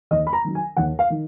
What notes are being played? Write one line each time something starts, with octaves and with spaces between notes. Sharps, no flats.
D#2 D#5
B5
A#5
D#3 F#3
G#5
D#2 F#5
F5
D#3